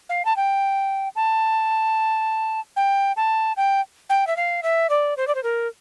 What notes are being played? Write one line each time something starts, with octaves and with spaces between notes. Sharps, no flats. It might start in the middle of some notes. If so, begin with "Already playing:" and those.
F5
A5
G5
A5
G5
A5
G5
G5
E5
F5
E5
D5
C5
D5
C5
A#4